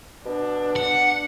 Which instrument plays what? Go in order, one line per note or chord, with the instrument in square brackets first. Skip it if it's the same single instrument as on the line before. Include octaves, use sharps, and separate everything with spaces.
[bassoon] B2 [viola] D4
[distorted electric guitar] F#5